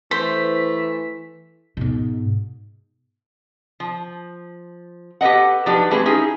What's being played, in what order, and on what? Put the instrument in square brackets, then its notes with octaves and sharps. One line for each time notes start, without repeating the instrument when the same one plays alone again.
[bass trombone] E3 [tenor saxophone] A3 [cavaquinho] C5 [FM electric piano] B6
[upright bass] G#2 B2
[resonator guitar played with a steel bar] F3
G4 A4 B4 D#5 F#5
F3 F#3 D4 D#4 G4 B4
E3 A3 C4 G4 G#4 B4
C#4 D#4 E4 G4 G#4